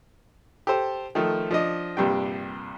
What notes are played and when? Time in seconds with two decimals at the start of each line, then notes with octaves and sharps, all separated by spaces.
0.67 G4 A4 C5
1.15 D#3 F3 A3
1.51 F3 D4 D#5
1.97 A#1 G2 C3 G5